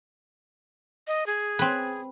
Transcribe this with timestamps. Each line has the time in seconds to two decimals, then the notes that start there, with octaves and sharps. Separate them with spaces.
1.07 D#5
1.26 G#4
1.59 C4 B4